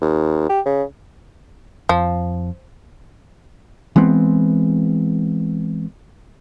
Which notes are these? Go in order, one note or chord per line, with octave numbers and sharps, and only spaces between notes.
D#2
G4
C#3
F2 F3
E3 G#3 B3 C4